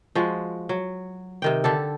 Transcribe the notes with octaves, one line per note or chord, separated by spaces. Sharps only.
F3 G#3 F#4
F#3
C3 D#3 G5
D3 G4 A4